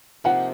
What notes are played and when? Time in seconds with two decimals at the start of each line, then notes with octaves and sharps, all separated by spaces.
0.24 C3 F3 A#3 D#4 F#5